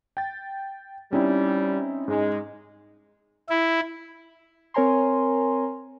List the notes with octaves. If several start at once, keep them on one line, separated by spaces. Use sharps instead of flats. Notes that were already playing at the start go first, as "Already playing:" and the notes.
G5 A6
G3 C4 C#4 D#4 E4
G#2 G#3 D#4
E4
C4 A#4 C#5 G#5 A#5 C6